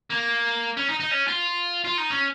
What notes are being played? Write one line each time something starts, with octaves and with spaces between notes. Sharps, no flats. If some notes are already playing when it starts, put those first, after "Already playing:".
A#3
C#4
D#4
D#4
C#4
F4
F4
D#4
C#4